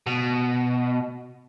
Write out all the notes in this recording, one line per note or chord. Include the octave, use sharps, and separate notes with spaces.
B2